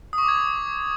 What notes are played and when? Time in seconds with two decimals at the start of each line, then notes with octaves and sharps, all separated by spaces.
0.13 D#6
0.18 C#6
0.23 D6
0.28 G#6